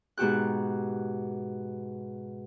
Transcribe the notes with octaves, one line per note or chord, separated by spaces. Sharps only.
G#2 B2 F#4 G4 F#6